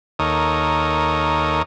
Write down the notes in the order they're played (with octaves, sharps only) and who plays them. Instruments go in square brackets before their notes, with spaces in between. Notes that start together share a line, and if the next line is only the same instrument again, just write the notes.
[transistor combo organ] D#2 D#4 A4 A#4 C#5 D#6